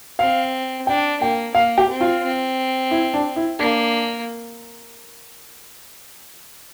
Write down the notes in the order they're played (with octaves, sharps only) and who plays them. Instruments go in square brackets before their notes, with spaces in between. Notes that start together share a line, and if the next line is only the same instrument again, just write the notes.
[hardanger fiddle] C4 [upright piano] F5
[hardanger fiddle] D4 [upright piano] G5
[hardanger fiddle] A#3 [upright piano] G5
[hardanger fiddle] A#3 [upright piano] F5
[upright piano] G4
[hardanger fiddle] C4
[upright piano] F4
[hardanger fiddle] C4
[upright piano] E4
D4
E4
[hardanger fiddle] A#3 [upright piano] D4